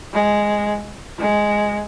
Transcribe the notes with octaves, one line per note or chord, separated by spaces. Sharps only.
G#3
G#3